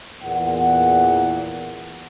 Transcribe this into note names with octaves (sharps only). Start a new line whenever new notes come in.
E2 A#2 F#5